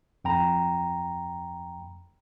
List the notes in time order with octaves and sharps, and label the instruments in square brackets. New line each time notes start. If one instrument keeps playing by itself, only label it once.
[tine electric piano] F2 G5 A#5 B5